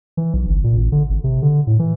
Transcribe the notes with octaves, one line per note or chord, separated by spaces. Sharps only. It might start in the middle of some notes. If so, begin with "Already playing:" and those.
E3
B1
G1
A#2
A1
D3
G#1
C3
D3
A2
E3